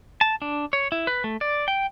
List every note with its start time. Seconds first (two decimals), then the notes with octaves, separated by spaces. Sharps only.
0.21 A5
0.42 D4
0.73 C#5
0.92 E4
1.07 B4
1.24 A3
1.41 D5
1.68 G5